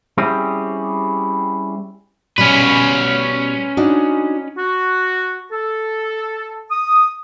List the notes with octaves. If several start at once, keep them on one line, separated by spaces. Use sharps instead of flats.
G3 C4 C#4 E4 G4 G#4
B2 G3 C#4 B4
D4 D#4 F#4
F#4
A4
D#6